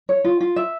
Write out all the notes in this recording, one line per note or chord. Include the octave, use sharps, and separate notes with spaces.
C#5
F4
F4
E5